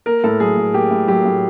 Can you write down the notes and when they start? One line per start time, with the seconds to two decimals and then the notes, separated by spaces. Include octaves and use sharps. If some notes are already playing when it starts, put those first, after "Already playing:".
0.06 A#3 A#4
0.24 A2 A4
0.40 F#3 G#4
0.57 A2
0.74 A#3 G4
0.91 A2
1.08 F#3 G4
1.25 A2